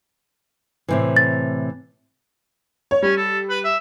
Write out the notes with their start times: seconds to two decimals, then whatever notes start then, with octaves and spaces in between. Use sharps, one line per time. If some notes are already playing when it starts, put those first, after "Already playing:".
0.88 A2 C3 E3
1.16 A6
2.91 C#5
3.02 G3 C#4
3.17 A4
3.50 B4
3.64 E5